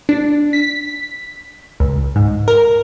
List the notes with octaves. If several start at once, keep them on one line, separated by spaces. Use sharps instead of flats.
D4
B6
C#2
G#2
A#4